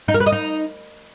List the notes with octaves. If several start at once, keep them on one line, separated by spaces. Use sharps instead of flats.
D#4
A#4
B4
D#5
D#4